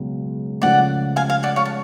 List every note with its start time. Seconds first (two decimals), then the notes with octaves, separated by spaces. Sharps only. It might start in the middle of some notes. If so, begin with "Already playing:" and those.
Already playing: C#2 B2 F#3
0.62 C#2 C#3 F3 A3 D5 F#5
1.16 F5 G#5
1.30 F5 G#5
1.43 D5 F#5
1.56 C#5 F5
1.65 A5